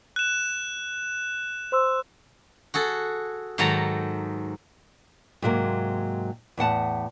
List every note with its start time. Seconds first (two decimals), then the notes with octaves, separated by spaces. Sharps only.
0.16 F#6 E7
1.72 C5 C6 E6
2.74 F#4 G#4 A4
3.58 G#2 D#3 F#3 A4 A#5
5.42 G#2 C3 F#3 G3 A#3
6.58 E2 A2 F#5 A5